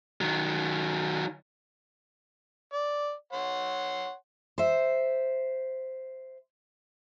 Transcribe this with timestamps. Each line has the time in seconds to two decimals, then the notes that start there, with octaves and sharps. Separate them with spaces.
0.21 D#3 F#3
2.73 D5
3.33 C#5 F#5 C6
4.58 C5 E5